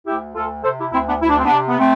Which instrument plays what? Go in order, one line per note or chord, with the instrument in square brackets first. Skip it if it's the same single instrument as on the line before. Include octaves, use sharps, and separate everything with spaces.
[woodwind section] D2 E4 G4
D2 F4 A4
C3 A4 C5
E4 G4
D2 C4 E4
B3 D4
D2 E4
D4
C4
B3 D4
C3
B3
A3 C4